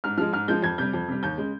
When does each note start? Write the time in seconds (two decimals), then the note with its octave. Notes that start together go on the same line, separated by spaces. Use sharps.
0.04 G#2 F6
0.18 F3 G#3 F6
0.33 G#2 F6
0.48 F3 G#3 G6
0.62 F2 G#6
0.78 C3 G3 G6
0.93 F2
1.08 C3 G3
1.23 D#2 G6
1.38 C#3 G#3